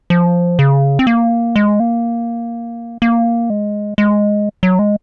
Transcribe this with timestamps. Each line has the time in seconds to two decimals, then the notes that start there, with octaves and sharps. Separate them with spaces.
0.10 F3
0.59 C#3
0.99 C4
1.07 A#3
1.56 G#3
1.80 A#3
3.02 A#3
3.50 G#3
3.98 G#3
4.63 F#3
4.79 G#3